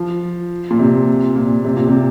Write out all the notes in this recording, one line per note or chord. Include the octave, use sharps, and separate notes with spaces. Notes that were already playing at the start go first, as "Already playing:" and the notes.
Already playing: F3
A#2
C3
A#2
C3
A#2
C3